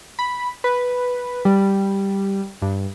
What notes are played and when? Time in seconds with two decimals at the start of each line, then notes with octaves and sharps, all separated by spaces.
0.19 B5
0.64 B4
1.45 G3
2.62 G2